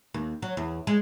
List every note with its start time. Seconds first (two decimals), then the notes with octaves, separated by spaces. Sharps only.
0.14 D#2
0.42 F#3
0.57 E2
0.87 G#3